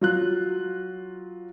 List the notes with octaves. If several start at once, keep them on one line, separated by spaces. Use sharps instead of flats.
F#3 F4 F#6